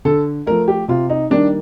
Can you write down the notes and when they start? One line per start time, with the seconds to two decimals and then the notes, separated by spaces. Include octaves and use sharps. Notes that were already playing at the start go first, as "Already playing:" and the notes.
0.05 D3 A4
0.46 F3 A3 A#4
0.68 G4
0.88 C3 F4
1.10 D#4
1.30 D#3 G3 A#3 D4